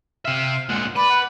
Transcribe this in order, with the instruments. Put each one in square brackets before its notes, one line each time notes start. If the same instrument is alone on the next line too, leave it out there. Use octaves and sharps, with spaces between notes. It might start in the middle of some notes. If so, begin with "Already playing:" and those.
[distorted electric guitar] C3 E5 [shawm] F5
[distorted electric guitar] A#2 G#3 [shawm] F#5
[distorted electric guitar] B4 [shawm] D5 [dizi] B5
[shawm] F#5